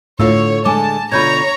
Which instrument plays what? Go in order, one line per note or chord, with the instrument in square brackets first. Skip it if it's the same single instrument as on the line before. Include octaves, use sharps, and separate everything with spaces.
[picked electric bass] A2 [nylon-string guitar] D3 A4 F5 [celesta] F4 E6 [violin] C#5
[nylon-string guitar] D3 G#3 A4 [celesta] G#5 D6 [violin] A5
[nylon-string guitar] B2 D3 F4 [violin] C#5 A#5 [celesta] B5 G6 G#6